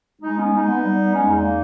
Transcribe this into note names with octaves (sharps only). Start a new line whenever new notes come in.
G#3 D#4
B3 C#4
G#3 D#4
B3
G3
B3
G#3 C#4
E2 D#4
A#3